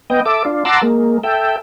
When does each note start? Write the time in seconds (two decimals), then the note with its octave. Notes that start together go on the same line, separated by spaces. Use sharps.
0.10 B3 D#5 G5
0.26 A4 E5 D6
0.45 D4 F4
0.65 F#5 A5 A#5 C6 D6 E6
0.82 G#3 A#3
1.23 A4 E5 G5